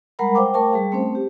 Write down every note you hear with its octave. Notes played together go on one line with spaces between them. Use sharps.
G3 G#3 A#4 F#5 A#5 B5
C5 F5 G5 D6
A3 A#4 G5 A5 C#6
G3 G#4 F5
A3 C4 C#4 C5
G4